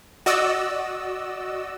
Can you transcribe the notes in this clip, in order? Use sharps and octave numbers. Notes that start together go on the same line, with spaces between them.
F#4 D5 D#5 E6